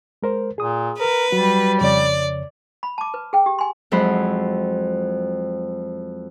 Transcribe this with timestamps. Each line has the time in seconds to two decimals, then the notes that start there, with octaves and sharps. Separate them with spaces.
0.23 G#3 A#4 C5
0.58 A#2 G#4 D#6
1.00 A#4 B4
1.32 F#3 G3 F#4
1.81 F2 C#3 C#5 D5
2.83 B5
2.98 A5 D6
3.14 B4
3.33 G#4 G5
3.46 G4
3.59 G#5 C6
3.92 F2 F#3 G#3 E4 C5 B5